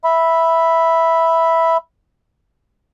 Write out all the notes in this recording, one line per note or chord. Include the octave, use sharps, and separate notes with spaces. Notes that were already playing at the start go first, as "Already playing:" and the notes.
E5 B5